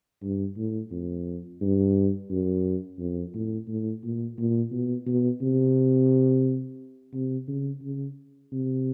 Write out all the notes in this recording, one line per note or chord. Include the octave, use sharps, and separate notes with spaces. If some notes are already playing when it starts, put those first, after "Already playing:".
G2
A2
F2
G2
F#2
F2
A2
A2
A#2
A#2
B2
B2
C3
C3
C#3
C#3
C3